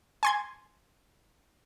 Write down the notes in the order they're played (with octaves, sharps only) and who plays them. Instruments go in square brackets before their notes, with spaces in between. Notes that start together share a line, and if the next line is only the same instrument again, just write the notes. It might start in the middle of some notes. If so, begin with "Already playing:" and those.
[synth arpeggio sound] G#5 C6 G#6